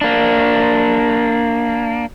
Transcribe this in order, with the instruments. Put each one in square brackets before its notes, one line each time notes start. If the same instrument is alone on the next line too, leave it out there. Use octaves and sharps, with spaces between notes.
[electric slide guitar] A#3 D4